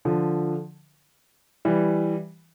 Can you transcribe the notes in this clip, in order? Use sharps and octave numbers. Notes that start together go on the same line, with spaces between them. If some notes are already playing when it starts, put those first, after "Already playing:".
D3 F3
E3 G3